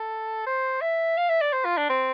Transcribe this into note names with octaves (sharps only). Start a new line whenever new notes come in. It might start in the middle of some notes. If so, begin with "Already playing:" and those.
Already playing: A4
C5
E5
F5
E5
D5
C5
F4
D4
C4